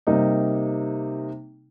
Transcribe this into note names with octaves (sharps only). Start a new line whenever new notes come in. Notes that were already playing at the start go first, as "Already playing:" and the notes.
C3 G3 A#3 D#4